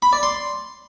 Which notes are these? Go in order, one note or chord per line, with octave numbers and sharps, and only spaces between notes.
B5
D5
C6